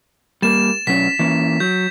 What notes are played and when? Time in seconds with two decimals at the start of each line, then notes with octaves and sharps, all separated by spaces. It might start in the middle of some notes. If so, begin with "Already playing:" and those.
0.42 G3 A#3 A6 E7
0.87 B2 F#3 C#4 B6
1.19 E3 A#3 C#4
1.60 F#3 G6